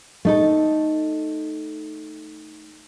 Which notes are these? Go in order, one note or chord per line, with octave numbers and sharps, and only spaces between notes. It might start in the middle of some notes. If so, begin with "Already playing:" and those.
A3 D#4 A4